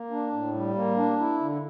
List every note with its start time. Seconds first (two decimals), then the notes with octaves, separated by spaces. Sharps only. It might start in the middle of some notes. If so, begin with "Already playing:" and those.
Already playing: A#3
0.11 D4
0.33 A2
0.54 G3
0.75 A#3
0.97 D4
1.18 E4
1.40 D3